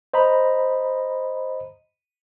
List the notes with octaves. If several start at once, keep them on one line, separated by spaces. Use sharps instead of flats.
C5 D#5 A#5 B5